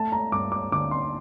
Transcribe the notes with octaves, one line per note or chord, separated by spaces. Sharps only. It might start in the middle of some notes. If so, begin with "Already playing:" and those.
Already playing: A3 A5
A#5
G2 D6
D6
D3 D6
C6